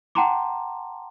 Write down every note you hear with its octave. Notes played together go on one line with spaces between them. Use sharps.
F#5 G5 A5 A#5 C6 D6